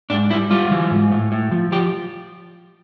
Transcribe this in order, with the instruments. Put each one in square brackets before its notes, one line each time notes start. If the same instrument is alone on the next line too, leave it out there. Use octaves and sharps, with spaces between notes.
[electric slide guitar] G#2 D4
G3 E4
G3 F4
E3
G#2
A2
A2
F3
F3 G4